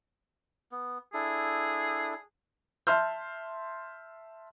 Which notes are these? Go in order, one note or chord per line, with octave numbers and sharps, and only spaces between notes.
B3
D4 E4 G#4 A4
E5 A5 C6 F6 G6